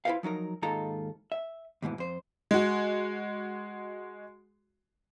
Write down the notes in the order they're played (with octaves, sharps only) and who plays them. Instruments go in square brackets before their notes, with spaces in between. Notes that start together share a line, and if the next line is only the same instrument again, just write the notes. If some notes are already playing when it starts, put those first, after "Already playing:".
[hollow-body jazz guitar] E4 F4 A4 B4 C5 F5
F3 F#3 D#4 A#4
D#2 G#2 D#4 F4 A4 A#5
E5
D#2 G#2 B2 E3
F2 C5
[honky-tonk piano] G#3 F#4